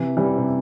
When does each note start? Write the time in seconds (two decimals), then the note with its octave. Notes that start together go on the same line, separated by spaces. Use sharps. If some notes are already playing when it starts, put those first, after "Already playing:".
Already playing: C3 E3
0.17 E3 G3
0.38 C3